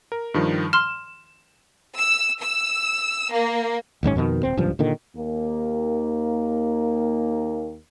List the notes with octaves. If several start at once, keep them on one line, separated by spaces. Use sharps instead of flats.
A#4
G2 D#3 F3
C6 F6 E7
E6
E6
A#3
D1 G#1 G#2 C#4
F2 B2 D3 D#3
D#1 C4
D1 C#2 G2 F3
A#2 D3 D#3
D#2 A#3